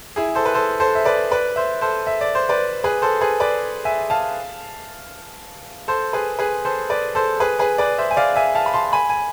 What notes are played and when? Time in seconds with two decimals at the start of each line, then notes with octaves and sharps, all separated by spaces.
0.16 E4 G#4
0.35 A4 C5
0.46 B4
0.54 A4 C5
0.80 A4 C5
0.95 E5
1.05 B4 D5
1.31 B4 D5
1.56 C5 E5
1.81 A4 C5
2.07 E5
2.21 D5
2.35 C5
2.49 B4 D5
2.84 G#4 B4
3.02 A4 C5
3.21 G#4 B4
3.40 B4 D5
3.85 E5 G#5
4.10 F5 A5
5.88 A4 C5
6.13 G#4 B4
6.39 G#4 B4
6.65 A4 C5
6.90 B4 D5
7.15 A4 C5
7.40 G#4 B4
7.59 G#4 B4
7.78 B4 D5
7.98 C5 E5
8.11 G#5
8.17 D5 F5
8.36 E5 G#5
8.55 F5 A5
8.66 B5
8.74 A5 C6
8.93 G#5 B5
9.10 G#5